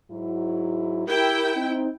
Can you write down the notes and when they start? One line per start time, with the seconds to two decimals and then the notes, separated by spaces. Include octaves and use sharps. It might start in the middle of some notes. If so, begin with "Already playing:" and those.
0.11 G#2 F#3 E4
1.08 E4 G4 A#4 G5
1.56 C4 D#4